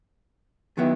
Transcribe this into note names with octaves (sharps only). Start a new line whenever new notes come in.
D#3 F#3 B3 E4